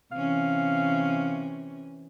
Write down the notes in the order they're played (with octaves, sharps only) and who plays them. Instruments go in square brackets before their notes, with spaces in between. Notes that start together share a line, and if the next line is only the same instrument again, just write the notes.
[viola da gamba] C3 E3 C#4 [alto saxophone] F5